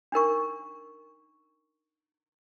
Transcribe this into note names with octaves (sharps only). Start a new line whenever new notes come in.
D4 D#4 A#4 C#6